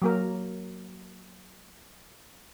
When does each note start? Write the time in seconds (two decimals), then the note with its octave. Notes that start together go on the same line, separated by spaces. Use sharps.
0.02 F#3 A#3 A#4